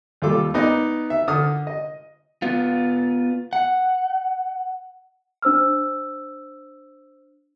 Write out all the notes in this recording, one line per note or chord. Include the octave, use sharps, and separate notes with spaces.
D#2 G3 F4 A4 D6
B3 D#4 D5 D#5
E5
D3 D#6 F6
D#5
B3 F4
F#5
D4 C5 E6 F6